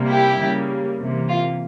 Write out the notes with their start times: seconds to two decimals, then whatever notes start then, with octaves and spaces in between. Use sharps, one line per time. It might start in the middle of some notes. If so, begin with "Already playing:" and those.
Already playing: C3 G3 A#3
0.10 E4 G4
0.39 C#3 G3 A#3
1.00 C3 E3 A#3
1.29 F4